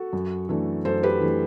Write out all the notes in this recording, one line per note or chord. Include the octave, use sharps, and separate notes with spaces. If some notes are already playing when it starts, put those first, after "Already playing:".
Already playing: F#4 A4
F#2
E3 A3 D4
F#2 A4 C5
G4 B4
E3 A3 D4